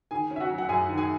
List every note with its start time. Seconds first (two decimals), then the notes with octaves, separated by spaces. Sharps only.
0.11 D#3 G#4 G#5
0.31 C#4
0.36 E5
0.40 F#4 F#5
0.50 F#3
0.58 F#5
0.69 F#2 G#4 G#5
0.88 D#3
0.98 G#4 G#5